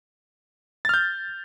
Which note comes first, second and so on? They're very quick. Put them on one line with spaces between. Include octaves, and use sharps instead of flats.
A6 F6 G6